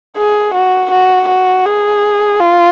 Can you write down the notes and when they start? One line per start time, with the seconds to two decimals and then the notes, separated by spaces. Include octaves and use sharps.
0.17 G#4
0.55 F#4
0.91 F#4
1.29 F#4
1.66 G#4
2.40 F4